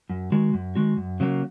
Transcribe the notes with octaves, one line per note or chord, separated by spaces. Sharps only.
F#2
D#3 G#3 F#4
F#2
D#3 G#3 F#4
F#2
C#3 F#3 A#3